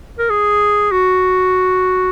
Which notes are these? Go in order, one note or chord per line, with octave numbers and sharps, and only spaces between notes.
A#4
G#4
F#4